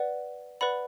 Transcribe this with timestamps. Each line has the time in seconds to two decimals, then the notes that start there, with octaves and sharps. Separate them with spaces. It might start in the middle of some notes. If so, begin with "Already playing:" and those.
Already playing: B4 D5 F#5
0.61 B4 D5 F#5 B5